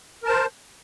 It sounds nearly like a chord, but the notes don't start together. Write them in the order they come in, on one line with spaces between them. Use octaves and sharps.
A#4 A5 C5